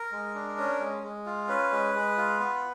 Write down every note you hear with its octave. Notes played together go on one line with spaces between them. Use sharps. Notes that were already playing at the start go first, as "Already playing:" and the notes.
Already playing: A#4
G#3
D4
C#4
G#3
G#3
F4
C#4 B4
G#3
G#3
F4
B3